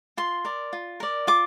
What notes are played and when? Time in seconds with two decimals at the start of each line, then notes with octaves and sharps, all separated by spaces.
0.17 F4 C6
0.45 A#4 D5
0.73 F4
1.00 A#4 D5
1.27 F4 D6